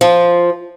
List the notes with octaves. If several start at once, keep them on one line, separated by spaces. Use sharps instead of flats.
F3